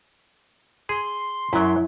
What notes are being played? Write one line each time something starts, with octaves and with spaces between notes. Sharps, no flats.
G#4 C6
F#2 F#3 E4